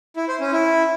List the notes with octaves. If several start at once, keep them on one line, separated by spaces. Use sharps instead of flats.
E4
C5
C#4
E4